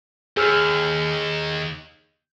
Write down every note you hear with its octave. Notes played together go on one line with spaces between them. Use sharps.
D#2 G#4 E6 F6